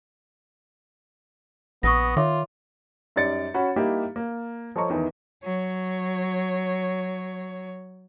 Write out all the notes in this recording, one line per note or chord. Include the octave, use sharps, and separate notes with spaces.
A#1 B3 C#6 D#6 A#6
D#3 F4 C#5 E5 D6
F#2 G3 D#4 D5 A6 C#7
C#4 F#4 F#5 B5
G3 A#3 D#4 E4 G4
A#3
F3 A4 C#5 D#5 A#5 C#6
E2 D#3 E3
F#3 C#5